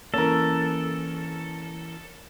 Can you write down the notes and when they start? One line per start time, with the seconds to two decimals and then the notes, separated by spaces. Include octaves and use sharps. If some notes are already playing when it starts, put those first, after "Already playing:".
0.14 E3 A#3 C#4 A4 A#4